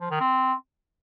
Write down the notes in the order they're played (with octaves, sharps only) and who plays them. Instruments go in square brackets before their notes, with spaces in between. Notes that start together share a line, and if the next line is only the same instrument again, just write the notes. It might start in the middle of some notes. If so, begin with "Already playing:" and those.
[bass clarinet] F3
D#3
C4